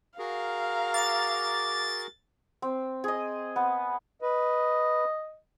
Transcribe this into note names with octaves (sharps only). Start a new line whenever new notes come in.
F#4 G#4 A#4 F5 A#5
D6 A6
C4
G#4 D#5
B3
B4 D#5